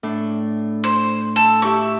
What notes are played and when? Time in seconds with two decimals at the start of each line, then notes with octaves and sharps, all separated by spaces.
0.03 A2 D4
0.84 C5
1.36 A4
1.62 E4 G4 E5 C#6